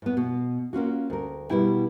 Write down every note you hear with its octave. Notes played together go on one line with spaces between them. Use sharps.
A2 B3
B2
A#3 C#4 F4 F#4
D2 A#4
B2 G3 B3 E4 G5